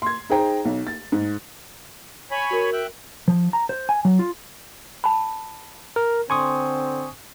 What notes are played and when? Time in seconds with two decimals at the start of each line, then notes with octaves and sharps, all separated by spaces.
0.02 C6 G#6
0.30 D#4 G#4 C5 G5 A#5
0.65 B1
0.87 A6
1.12 G#2
2.31 C#5 G#5 B5
2.51 F#4 A#4
2.72 E5 G5 F#6
3.28 F3
3.53 A#5
3.69 C5
3.89 G#5
4.05 F#3
4.19 F4
5.04 A5 B5
5.96 A#4
6.30 D3 C4 G#5 C6 C#6 D#6